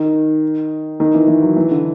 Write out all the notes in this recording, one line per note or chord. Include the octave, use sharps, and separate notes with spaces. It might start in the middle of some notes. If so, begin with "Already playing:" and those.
Already playing: D#3
D#3
E3
E3
F#3
E3
D3